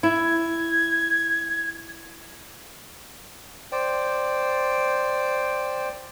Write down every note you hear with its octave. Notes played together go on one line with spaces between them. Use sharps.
E4 G#6
C5 D5 G5